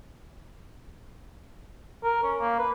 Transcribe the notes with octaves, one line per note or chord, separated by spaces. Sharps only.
A#4
C#4
A#3
B4